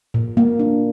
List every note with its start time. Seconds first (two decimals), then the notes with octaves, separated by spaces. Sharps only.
0.14 A#2
0.37 A#3
0.59 D4